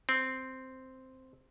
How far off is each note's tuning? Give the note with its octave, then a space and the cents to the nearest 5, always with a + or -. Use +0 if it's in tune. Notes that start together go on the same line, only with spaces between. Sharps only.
C4 -5